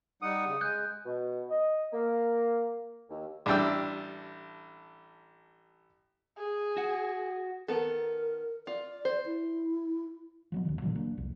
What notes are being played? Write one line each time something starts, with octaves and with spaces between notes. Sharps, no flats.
G3 D#4 F#5 D#6
C#3
G#3 F#6 G6
B2
D#5
A#3
D#2
A1 G3 D4 G5 E6
G#4
F#4 F#5
D#3 B3 A4 A#4
F4 D5
C5
E4
F3 F#3 B3
D2 C3 D#3
A#2 D3 E3 F#3
F#3 A#3 D4
F1 C2 F2